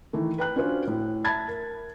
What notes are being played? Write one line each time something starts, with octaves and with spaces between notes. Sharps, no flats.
D#3 E3 A3
B4 G5 F#6
C#4 D4 F4 F#4 C5
A2
E5 A5 B5 G#6 A6
A#4